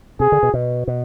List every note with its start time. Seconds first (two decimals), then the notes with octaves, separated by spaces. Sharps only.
0.20 C3 G#4
0.32 D3
0.43 B2
0.54 B2
0.87 B2